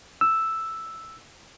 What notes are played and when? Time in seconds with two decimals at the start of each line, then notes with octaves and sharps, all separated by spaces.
0.21 E6